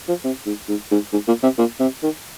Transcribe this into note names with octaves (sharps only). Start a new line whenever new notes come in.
F3
C3
G#2
G#2
G#2
G#2
A#2
C3
A#2
C3
D#3